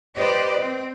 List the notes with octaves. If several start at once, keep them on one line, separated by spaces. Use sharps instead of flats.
G4 B4 C5 D5 D#5
C4